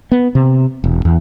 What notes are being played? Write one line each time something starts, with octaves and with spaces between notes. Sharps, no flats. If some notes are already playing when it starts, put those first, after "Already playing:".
B3
C3
E1
E2